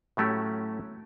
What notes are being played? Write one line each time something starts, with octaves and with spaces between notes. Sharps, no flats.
A2 F#3 A3 C#4 G4